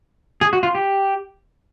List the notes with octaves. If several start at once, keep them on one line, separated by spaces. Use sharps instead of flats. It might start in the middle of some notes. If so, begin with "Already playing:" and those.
G#4
F#4
F4
G4